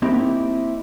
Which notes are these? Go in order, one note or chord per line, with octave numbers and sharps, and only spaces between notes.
A#3 C4 D#4 E4 G4